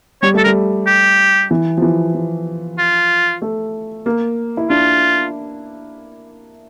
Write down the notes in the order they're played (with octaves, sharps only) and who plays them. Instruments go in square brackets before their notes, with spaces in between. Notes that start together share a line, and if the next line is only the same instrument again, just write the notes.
[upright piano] G3 [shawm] C#5
[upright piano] A3 [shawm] A4
[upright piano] G3 [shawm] A#4
[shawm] G4
[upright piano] E3
F3
E3
F3
[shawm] F4
[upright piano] A3
A#3
E4
[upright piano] D4 [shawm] F4